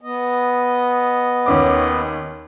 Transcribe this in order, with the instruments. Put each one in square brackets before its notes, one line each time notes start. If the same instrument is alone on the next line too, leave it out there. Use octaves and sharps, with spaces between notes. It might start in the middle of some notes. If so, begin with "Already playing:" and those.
[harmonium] B3 D#5
[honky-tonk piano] D#2 C#4 D6